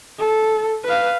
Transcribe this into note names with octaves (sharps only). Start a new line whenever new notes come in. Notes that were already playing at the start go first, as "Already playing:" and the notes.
A4
B4 F5